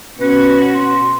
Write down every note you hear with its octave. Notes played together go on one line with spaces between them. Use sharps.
B2 C#4 F#4 B4
C6